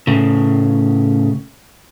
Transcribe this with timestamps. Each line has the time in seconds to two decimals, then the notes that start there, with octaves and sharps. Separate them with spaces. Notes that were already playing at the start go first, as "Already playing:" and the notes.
0.07 A2 C#3